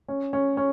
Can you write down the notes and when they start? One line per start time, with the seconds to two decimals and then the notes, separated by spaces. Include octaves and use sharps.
0.08 C#4
0.33 C#4
0.57 C#4